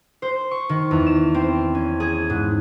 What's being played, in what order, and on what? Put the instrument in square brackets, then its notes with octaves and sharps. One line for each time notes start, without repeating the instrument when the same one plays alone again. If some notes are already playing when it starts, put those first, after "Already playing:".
[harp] C5
C#6
D#3
E2
E7
C4
C#4
G#4
G#2